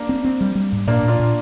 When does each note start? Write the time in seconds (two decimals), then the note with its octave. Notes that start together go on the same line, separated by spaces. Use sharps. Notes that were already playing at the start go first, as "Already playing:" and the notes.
Already playing: A#3 D4
0.09 C4
0.25 C4
0.41 G3
0.55 G3
0.72 G#2
0.87 A#2 A#3 D4
1.03 A#2
1.08 D4 F4
1.20 A#2